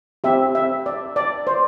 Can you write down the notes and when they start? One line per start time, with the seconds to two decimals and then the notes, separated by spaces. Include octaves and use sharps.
0.24 C4 G4 E5
0.55 E5
0.86 D5
1.16 D5
1.47 C5